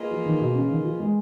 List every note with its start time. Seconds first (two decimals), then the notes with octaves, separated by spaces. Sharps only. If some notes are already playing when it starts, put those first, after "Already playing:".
Already playing: A#3 F4 G#4 B4 D#5
0.10 F3
0.25 D#3
0.40 B2
0.55 C#3
0.69 D#3
0.84 F3
1.00 G#3